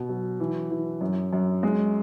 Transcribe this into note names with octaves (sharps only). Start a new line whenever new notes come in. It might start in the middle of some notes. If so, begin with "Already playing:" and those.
Already playing: B2
F#3
E3
E3
F#2
F#2
G#3